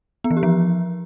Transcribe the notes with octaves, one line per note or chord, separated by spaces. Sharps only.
B3
E3
G4
F3